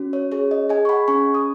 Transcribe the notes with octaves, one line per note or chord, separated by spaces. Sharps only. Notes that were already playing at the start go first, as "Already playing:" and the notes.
Already playing: C#4 F#4
C#5
G#4 C#5
D#5
G#4 D#5 G#5
C#6
F#5 B5
C#4 G#5 C#6
D#6